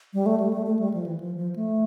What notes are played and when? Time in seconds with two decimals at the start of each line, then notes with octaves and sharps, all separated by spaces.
0.13 G3
0.26 A3
0.40 G3
0.53 A3
0.66 A3
0.79 G3
0.94 F3
1.06 E3
1.20 F3
1.37 F3
1.55 A3